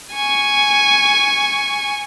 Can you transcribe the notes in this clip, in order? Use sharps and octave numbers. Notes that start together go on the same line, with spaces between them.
G#5 C#6